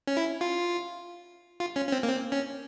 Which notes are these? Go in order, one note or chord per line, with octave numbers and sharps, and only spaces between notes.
C#4
E4
F4
F4
C#4
C#4
C4
A#3
C4
C#4